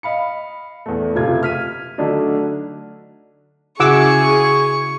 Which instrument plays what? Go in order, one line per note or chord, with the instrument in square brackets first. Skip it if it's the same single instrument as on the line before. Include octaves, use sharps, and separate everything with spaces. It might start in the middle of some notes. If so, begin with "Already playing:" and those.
[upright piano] D#5 F5 B5 C#7
E2 A3
F#1 C3 A3 F4 G#6
F6 B6 D#7
D3 F#3 A3 D4 D#4
[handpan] C#3 E4 F#4 [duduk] G#4 [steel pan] F#5 D6 E6 [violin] C#6